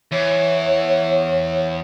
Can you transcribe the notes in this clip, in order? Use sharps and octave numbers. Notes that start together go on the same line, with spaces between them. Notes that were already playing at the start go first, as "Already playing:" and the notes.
E2 C#5